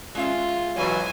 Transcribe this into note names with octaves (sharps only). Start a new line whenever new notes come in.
G#3 C#4 F4 E5
B1 E3 F#3 C5 G#5